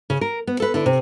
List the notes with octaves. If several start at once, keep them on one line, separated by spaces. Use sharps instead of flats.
C#3
A#4
B3
A4 B4
D3 E4
C3